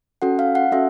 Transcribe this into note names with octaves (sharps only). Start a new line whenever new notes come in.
C#4 F#4 A4 F#5
F5
F#5
C#4 F#4 A4 E5